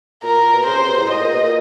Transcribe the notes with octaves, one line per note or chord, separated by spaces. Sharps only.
A#2 A#4
A#2
B2
C#3 C5
C3
B2
A2
G#2 D#5
A#2
B2
A#2